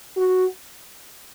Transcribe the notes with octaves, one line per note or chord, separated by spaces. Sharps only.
F#4